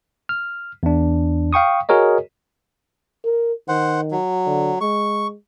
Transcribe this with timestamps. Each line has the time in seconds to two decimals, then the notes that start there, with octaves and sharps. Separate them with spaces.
0.29 F6
0.83 E2 D4
1.53 F5 G5 C#6 D#6
1.89 F#4 G#4 A#4 C#5 D#5
3.25 A#4
3.68 D#3 C5 F#5
4.11 F#3
4.47 D3
4.81 G#3 C#6